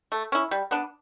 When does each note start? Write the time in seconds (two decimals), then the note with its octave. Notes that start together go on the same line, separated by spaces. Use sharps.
0.12 A3
0.32 C#4 E4
0.51 G3
0.71 B3 D4